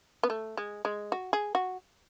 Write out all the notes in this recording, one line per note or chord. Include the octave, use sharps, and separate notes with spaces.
B3
A3
G#3
G#3
F#4
G#4
F#4